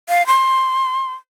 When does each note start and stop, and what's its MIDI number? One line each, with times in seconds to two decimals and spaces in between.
0.09 0.26 77
0.27 1.13 84